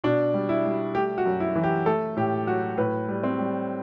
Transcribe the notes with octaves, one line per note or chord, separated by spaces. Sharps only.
B2 D4
G3
E4
G3
A3 G4
F#4
F#2
E4
E3
G4
A3 A4
A2 G4
F#3 F#4
A2 B4
G3
C4
G3